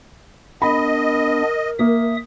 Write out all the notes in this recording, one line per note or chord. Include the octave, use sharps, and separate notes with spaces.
B3 D4 A#4 D#5 B5
A#3 E5 D#6